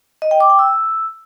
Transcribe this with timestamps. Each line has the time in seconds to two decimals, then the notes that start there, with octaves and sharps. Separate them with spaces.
0.22 D#5
0.31 G5
0.40 D6
0.50 G5
0.59 E6